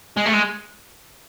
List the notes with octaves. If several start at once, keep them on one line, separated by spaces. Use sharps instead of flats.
G#3
A3
G#3